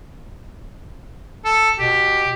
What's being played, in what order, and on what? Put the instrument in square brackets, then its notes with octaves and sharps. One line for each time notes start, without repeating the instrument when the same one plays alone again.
[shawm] A4
[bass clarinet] B2 [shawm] G4